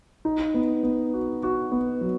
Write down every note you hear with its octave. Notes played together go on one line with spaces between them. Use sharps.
D#4
B3
B3
F#4
F#4
B3
F#3